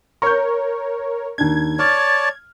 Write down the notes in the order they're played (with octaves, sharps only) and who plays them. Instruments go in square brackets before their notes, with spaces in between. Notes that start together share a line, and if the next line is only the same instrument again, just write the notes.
[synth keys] A#4 C#5 [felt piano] C#6 G6
[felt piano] D#2 D4 [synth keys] G#6
[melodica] C#5 D5 A5 [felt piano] F6